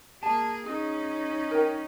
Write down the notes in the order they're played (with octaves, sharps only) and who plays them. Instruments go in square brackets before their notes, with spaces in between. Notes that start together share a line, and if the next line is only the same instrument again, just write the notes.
[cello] A#3 G#4 [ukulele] A5
[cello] C#4 D#4 [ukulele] G#4
[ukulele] A#4 G5